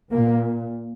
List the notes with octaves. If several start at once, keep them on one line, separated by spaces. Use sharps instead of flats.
A#2 A#3